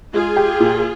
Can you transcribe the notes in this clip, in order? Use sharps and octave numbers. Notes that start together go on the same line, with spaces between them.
G#3 F4 G#4
G4
A#2